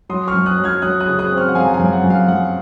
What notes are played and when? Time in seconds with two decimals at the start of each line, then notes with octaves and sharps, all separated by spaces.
0.09 F#3 C6 D#6
0.28 C#6 F6
0.34 F#2
0.46 D#6 F#6
0.58 F#3
0.64 F6 G#6
0.82 F#3 D#6 F#6
1.00 D#6 F#6
1.07 C#3
1.19 D#6 F#6
1.32 C4
1.37 C#6 F6
1.49 F#5
1.55 F#2 F5 G#5
1.64 A#5
1.74 F5 G#5
1.79 F#2
1.93 F#5
2.04 F#2
2.10 F5
2.28 F#2 F#5